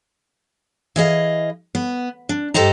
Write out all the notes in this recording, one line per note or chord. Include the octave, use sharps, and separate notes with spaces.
E3 G#4 D#5 F5
B3
D4
G2 G4 A4 C5 D#5 A#5